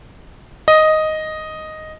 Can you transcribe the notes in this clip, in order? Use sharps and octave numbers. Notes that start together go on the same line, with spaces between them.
D#5